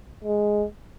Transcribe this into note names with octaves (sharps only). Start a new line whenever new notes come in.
G#3